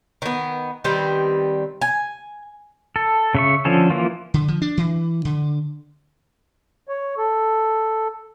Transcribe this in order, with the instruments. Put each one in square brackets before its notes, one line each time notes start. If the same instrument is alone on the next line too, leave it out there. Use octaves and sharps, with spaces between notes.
[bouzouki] D#3 B3
D#3 G3 B3 C4
G#5
[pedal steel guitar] A4
C#3 E5 C#6
D3 F3 C#4 A4
E3 F3 A#3 F4
[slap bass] D3
F3
D4
E3
D3
[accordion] C#5
A4